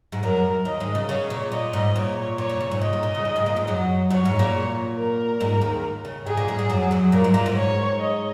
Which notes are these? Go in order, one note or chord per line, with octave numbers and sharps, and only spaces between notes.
G#2 G#3
F#2 F#3 A#4
D#2 D#3 D#5
G#2 G#3
C#3
C#3 C#5
A#2
A#2 D#5
G#2
A#2 C#5
A#2 C#5
A#2
C#3
G#2
A#2 D#5
G#2
A#2
C#3
D#2 D#3
G#2 G#3
A#2 A#3
G#2 G#3
F#2 F#3
F#2 F#3 C#5
G#2 G#3
A#2 A#3
A#4
G#2 G#3
D#2 D#3
C#3
G#2 G#3 G#4
A#2 A#3
G#2 G#3
G#2 G#3
F#2 F#3
F#2 F#3
A#2 A#3 A#4
G#2 G#3
A#2 A#3
G#2 G#3
C#5
D#5